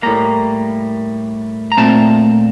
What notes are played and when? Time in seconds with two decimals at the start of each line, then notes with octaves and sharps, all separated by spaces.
0.03 A2 G3 A#3 A#5
1.72 A#5
1.77 A#2 A3 C4 A5